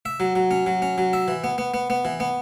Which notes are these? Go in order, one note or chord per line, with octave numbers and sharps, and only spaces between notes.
E5
F#3
F#3
C#4
F#3
C#4
F#3
E5
E3
B3
B3
B3
B3
E3
B3